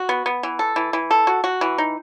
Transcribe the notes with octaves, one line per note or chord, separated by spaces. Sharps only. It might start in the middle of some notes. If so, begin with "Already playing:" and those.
Already playing: F#4
B3
B3
E3
A4
E3
E3
A4
F#4
F#4
E3
D#4